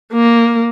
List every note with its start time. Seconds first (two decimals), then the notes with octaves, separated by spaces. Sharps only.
0.13 A#3